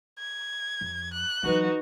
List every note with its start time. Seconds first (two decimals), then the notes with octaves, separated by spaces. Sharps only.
0.19 G#6
0.81 F2
1.13 F#6
1.43 E3 F#3 D#4 F#4 B4